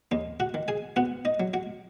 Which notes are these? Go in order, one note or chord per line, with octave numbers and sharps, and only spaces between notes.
D#2 D#4
F#4 F#5
D#3
G#4 G#5
B3 F#4 F#5
D#4 D#5
F#3
F#4 F#5